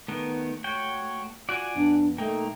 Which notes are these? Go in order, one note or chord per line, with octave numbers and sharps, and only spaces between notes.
D#3 A3 B3
F#4 C#5 G5
F4 F#4 D5 F#5 G#5
F2 B3 D4
B1 A3 A#3 D#4 G5